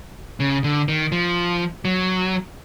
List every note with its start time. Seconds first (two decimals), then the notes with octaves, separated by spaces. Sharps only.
0.40 C#3
0.64 D3
0.88 D#3
1.12 F3
1.85 F#3